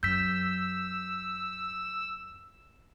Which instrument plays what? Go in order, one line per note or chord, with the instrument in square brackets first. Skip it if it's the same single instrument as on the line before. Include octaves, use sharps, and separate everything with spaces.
[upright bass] F#2 [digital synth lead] E6 [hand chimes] G6 B6